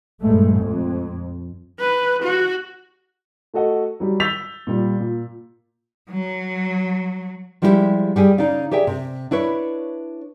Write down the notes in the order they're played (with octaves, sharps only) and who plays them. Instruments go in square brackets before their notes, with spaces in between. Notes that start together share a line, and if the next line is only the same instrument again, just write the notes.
[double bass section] A#1 G2 G#3 A3
F2
[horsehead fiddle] B4
F#4
[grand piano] A3 F#4 A4 D#5 F#5
F#3 G3 G4
E6 G6 A6 B6 F7
A#2 G3
A#2
[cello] F#3
[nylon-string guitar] F3 G3 G#3 E4 F4 G4
G3 G4 G#4
C#3 D#4 D5 F5
G4 G#4 D5 E5 G5
C3
D4 E4 B4 C#5